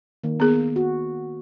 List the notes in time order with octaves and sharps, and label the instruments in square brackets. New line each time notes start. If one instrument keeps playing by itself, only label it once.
[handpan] D#3 A#3
[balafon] B3 G#4
[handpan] F#4